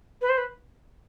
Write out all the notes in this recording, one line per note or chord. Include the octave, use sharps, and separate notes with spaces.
B4
C5
B4